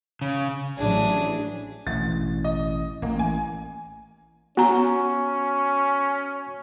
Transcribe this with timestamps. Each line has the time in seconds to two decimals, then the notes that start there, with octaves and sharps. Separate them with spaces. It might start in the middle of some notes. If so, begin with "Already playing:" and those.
0.21 C#3
0.77 A1 E3 F#3 D4 G#4
1.87 A1 B2 A6
2.44 D#5
3.02 A1 A#3
3.19 G#5
4.57 B3 C#4 F#4 A#5